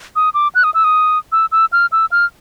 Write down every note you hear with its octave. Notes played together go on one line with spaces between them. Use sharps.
D#6
D6
F#6
D#6
E6
D#6
E6
E6
F6
E6
F6